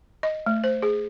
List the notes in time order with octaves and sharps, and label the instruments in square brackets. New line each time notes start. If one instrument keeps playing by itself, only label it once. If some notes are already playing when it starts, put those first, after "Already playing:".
[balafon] D#5
A3
C5
G#4